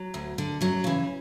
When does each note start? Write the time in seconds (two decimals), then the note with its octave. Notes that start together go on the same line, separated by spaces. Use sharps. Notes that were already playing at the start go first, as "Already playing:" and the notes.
Already playing: F#3
0.14 D2
0.38 D3
0.61 F#2 F#3
0.84 C#3 E3